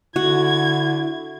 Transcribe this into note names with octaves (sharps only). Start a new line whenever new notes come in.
D3 E4 F#4 G#6